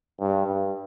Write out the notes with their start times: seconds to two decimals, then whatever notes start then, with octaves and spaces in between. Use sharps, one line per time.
0.20 G2
0.47 G2